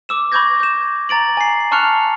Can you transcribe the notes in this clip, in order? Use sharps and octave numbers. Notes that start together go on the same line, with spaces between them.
D6 E6 E7
B5 C#6 D6 G6 G#6 A#6
G6 E7
A#5 A6 D7 F#7
G#5 C7
A5 C#6 F6 F#6 C#7 F7